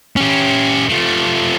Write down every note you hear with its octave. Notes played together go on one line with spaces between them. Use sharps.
C#4 G4
F3 A3